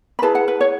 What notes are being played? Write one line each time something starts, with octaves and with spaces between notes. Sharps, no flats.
B5
E4 G#4 B4 A5
F#5
B4
C#5